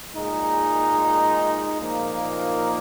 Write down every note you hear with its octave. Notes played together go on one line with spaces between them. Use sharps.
A#2 G#3 D#4
A#2 F3 A#3 D#4